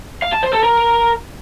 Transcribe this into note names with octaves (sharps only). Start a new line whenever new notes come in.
F5
A5
C5
A4
A#4